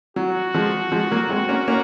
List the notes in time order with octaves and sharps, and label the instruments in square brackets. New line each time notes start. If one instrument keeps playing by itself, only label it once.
[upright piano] F#3 [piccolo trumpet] F#4
[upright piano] F3 G#3
F3 G#3
F#3 A#3
G#3 C4
A#3 C#4
A#3 C#4